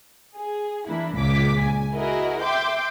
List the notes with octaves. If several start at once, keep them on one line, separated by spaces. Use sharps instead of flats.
G#4
E3 A#3 D4 E4
C#2 A#2 C#3 G#3 D6 B6
G#5
E4 F#4 G#4 A#4 D#5
E5 G5 C6 D6 G6